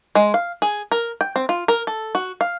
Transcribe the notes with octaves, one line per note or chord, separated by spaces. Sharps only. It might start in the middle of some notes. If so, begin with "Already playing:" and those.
G#3
F5
G#4
A#4
G5
C4
F4
A#4
A4
F#4
F5